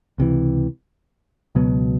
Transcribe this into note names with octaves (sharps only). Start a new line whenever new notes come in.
C#2 C3 E3
C#2 B2 F#3 B3